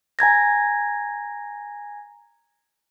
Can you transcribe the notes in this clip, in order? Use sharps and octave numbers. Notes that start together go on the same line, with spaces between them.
G#5 A#5 G#6 A#6